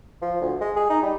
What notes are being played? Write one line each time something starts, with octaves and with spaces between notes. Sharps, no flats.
F3
D2
G#3
G#4
D#4
G3